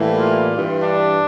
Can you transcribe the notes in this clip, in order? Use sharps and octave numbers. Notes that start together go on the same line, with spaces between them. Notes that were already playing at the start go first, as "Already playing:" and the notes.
Already playing: A2 E3 G3 A#3
F4
G2 E3 G3
D4